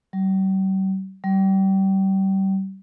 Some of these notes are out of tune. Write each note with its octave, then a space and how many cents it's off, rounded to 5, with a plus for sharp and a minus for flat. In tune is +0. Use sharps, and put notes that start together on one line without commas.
G3 -45
G3 -30